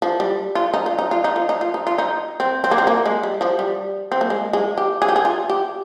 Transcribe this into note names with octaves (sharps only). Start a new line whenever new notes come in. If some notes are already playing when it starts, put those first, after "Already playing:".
F3
G3
F4
D#4
F4
D#4
F4
D#4
F4
D#4
F4
D#4
F4
D#4
C4
C4
A#3
C4
A#3
G#3
G3
F3
G3
C4
A#3
G#3
G#3
G4
G#4
G4
G#4
F4
G4